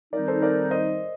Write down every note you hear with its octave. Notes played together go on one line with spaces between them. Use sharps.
D#3 G3 C4 D#4 A#4 D5
A4 C5
A#4 D5
C5 D#5